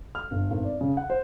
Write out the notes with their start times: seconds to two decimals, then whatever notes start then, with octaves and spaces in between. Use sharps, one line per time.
0.15 F6
0.31 G1
0.50 G#1
0.65 D5
0.81 C#3
0.97 F#5
1.10 C5